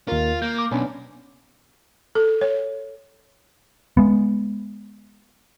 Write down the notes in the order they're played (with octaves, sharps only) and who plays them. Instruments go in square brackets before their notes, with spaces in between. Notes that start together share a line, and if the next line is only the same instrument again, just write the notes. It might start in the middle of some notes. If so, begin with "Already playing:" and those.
[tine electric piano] D#2 A#4 [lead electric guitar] F4
[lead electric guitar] A#3 [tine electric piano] G6
[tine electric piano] D6
[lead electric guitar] B1 [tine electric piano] B3 C#4 D4
[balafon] A4
C#5
[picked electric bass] G#3 B3